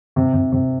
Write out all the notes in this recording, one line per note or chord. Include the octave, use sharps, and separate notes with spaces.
C3
C3
C3